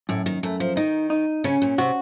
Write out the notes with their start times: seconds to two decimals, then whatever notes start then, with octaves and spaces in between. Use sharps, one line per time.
0.09 F#2 A2
0.26 D#3
0.43 F#2 A3
0.60 F3
0.77 D#3 D#4
1.10 D#4
1.44 C#3 C#4
1.62 A#2
1.78 C3 F#4